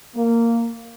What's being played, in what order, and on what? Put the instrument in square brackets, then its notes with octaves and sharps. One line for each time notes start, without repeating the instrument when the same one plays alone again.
[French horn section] A#3